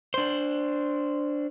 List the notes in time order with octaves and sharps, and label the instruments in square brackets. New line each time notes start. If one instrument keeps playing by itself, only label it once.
[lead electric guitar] D4 C5